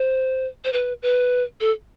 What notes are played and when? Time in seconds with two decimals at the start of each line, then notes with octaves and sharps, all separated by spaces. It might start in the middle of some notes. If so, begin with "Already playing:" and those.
Already playing: C5
0.64 C5
0.73 B4
1.02 B4
1.60 A4